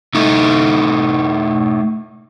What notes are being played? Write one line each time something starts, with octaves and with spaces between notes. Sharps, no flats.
A3 D#4 E4